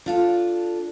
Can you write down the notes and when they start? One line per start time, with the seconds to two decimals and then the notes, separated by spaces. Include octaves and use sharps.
0.06 D4 F4 A4